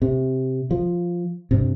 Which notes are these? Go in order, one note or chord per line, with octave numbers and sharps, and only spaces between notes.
C3
F3
G2 C3